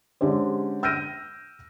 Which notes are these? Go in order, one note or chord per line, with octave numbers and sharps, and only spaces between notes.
D3 G#3 C#4 G4 C5
E6 F6 G6 A#6 D7 D#7